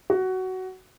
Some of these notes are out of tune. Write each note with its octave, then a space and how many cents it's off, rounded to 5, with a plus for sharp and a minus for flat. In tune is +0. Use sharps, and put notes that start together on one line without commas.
F#4 +15